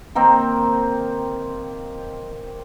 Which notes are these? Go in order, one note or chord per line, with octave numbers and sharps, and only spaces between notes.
D#3 A#3 C4 G5